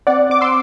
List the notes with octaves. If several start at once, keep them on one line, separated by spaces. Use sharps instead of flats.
C4 D5 F#5
C4 D6
C6 E6